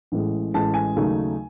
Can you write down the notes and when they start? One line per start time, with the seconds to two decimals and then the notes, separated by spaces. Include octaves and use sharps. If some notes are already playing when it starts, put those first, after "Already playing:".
0.12 A1 A2 G#3
0.54 A1 A2 G#3 A5
0.74 G#5
0.96 D#2 C#3 F#3 A3 D#4